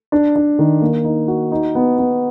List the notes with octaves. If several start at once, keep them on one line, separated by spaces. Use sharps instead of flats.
D4
D4
D#3
A#3
D#4
F#4
D#4
B3
B3